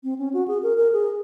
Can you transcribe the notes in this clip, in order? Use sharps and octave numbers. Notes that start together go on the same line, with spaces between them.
C4
C#4
F#4
G#4
A#4
A#4
G#4